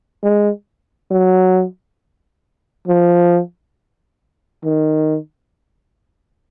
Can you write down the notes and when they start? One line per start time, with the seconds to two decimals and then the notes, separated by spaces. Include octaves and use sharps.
0.23 G#3
1.11 F#3
2.87 F3
4.64 D#3